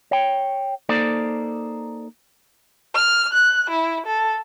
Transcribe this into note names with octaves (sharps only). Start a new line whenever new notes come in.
C#5 G5
A#3 D#4 A4 C5 D5
F6
F#6
E4
A4